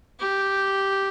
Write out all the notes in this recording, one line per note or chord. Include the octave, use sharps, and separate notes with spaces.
G4